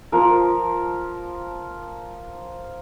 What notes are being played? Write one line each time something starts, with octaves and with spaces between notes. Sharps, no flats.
F3 A#4